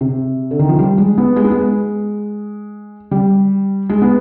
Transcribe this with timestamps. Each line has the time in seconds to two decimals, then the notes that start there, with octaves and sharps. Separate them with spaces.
0.01 C3
0.51 D3
0.59 D#3
0.69 F3
0.79 G3
0.98 G#3
1.18 B3
1.36 G#3
1.44 B3
1.52 G#3
3.11 G3
3.89 G#3
4.02 B3